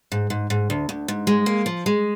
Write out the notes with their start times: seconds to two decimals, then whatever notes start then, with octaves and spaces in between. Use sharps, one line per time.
0.12 G#2
0.30 G#2
0.50 G#2
0.70 D2
0.89 D2
1.08 G#2
1.27 G#3
1.46 A#3
1.66 F3
1.86 G#3